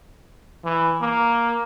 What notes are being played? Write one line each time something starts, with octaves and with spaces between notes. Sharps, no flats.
E3
A#3